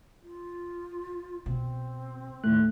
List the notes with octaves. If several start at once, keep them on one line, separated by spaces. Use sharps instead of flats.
F4
B2 C4
D#2 A2 A3 F#6